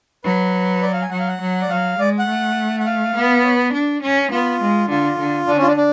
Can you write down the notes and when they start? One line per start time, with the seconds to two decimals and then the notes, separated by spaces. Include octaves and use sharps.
0.24 F#3 B4
0.82 D5
0.93 F5
1.02 G#5
1.11 F#3 F#5
1.19 F5
1.28 F#5
1.41 F#3
1.62 D5
1.70 F#3 F5
1.98 G#3 D5
2.19 F#5
2.27 A3
2.80 F#5
2.85 F5
3.15 B3
3.43 C#5
3.54 B4
3.73 D4
4.02 C#4
4.31 B3 F4
4.61 G#3
4.89 D3 F4
5.18 D3
5.47 D3 D4
5.57 C#4
5.62 F4
5.67 D4
5.77 D4